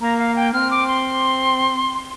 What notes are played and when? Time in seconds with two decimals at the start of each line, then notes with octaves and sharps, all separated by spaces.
0.01 A#3 A#5
0.19 F5
0.36 G5
0.53 C4 F6
0.71 D6
0.88 C6